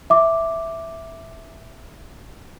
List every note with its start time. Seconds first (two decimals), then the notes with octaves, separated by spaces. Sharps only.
0.10 E5 D6